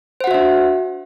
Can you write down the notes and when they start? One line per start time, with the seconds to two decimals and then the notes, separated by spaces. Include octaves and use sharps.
0.21 C5
0.24 F#5
0.27 F#4
0.31 E5
0.34 D4